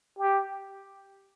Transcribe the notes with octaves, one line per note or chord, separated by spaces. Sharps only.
G4